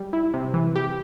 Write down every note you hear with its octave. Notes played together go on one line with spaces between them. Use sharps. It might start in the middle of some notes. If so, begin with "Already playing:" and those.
Already playing: G3
E4
C3
E3
G4